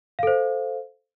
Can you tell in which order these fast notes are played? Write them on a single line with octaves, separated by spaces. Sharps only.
F5 A4 C5